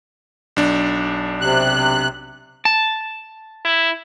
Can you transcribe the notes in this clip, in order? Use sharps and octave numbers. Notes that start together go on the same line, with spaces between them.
B1 D4
C3 F#6
A5
E4